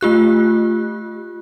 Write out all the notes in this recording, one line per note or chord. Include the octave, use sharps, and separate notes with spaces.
A3 F4 G4 F#6